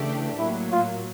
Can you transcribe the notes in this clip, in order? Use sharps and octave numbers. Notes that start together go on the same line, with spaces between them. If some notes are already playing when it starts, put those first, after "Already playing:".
Already playing: C#3 E3 A3 D4 G4
A2 F#3 A#3 E4
F4